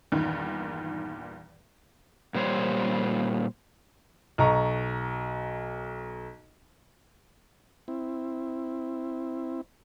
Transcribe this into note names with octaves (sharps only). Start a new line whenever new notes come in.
E2 G2 A#2 D#3
A#2 G3 C5 C#5
B1 D#5 A#5 C#6
C4 E4